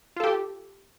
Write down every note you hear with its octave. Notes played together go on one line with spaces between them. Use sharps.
F4 G4 A4